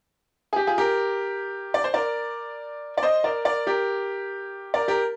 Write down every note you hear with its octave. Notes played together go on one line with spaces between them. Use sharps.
G#4
G4
F4 G#4
G4 A#4
D5
C5
A#4 D5
D5
C5 D#5
A#4 D5
A#4 D5
G4 A#4
A#4 D5
G4 A#4